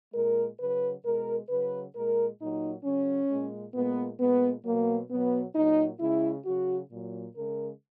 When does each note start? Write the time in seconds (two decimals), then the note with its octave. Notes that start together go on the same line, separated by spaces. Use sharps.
0.14 A#2 G#3 A#4
0.59 C#3 F#3 B4
1.04 B2 G#3 A#4
1.49 C#3 F#3 B4
1.94 A#2 G#3 A#4
2.40 A#2 F#3 D#4
2.85 C#3 F#3 C#4
3.30 A#2 G#3
3.75 A#2 G#3 B3
4.20 A#2 G#3 B3
4.65 B2 F#3 A#3
5.10 B2 F#3 B3
5.55 A#2 F#3 D#4
6.00 C#3 G#3 E4
6.45 C#3 F#3 F#4
6.90 A#2 F#3
7.35 C#3 G#3 A#4